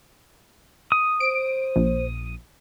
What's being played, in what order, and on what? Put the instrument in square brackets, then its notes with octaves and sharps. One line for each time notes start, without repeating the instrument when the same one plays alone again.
[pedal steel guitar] D#6
[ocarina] C5 [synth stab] D7
[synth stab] A#1